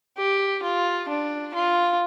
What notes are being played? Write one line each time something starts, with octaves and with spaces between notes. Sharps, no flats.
G4
F4
D4
F4